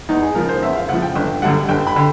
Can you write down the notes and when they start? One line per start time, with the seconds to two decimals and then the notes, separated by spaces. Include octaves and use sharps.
0.09 E2 D#4
0.22 G#4
0.35 C#3 F3 A#4
0.49 C5
0.62 E2 E5
0.76 F5
0.89 C#3 F3 F#5
1.02 G5
1.16 G1
1.42 F#2 D3 G3 F#5
1.69 G1 G5
1.87 B5
1.96 D3